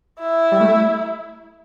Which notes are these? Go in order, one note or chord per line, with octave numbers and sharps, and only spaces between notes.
E4
G3
A3